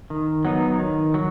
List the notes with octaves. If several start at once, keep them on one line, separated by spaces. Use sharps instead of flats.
D#3
F#3 B3 D#4
D#3
F#3